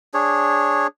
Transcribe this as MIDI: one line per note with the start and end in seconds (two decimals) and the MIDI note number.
0.14 0.87 62
0.14 0.87 68
0.14 0.87 73